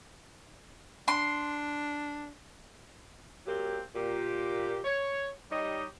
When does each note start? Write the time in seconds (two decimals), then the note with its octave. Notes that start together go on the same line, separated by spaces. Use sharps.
1.08 D4 C6
3.45 F#3 A#3 C4 G4
3.94 A#2 G4
4.84 C#5
5.50 G3 D#4 G4 C#5 D#5